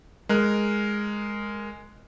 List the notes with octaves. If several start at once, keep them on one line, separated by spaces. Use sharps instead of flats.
G#3 A#4 F#6